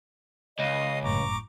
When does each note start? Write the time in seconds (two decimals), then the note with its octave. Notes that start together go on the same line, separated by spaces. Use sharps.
0.59 C#2 D#5 F5 D#6
1.03 G1 F#2 A2 A#5 C#6 D6